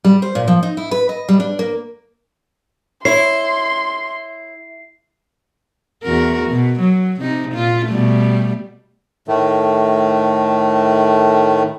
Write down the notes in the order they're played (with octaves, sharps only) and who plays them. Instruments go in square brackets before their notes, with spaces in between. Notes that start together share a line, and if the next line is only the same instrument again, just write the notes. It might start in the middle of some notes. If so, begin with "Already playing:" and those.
[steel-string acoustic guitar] G3
C5
A#2
F3
D#4
E4
B4
D#5
G3
D4
A#3
[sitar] E4 [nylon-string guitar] C#5 [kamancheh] C6 [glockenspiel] C7
[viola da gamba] E2 F#4 A#4
B2
F#3
C3 D#4
A#2 F4
B2 G3 A3
[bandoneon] A2 D#3 A3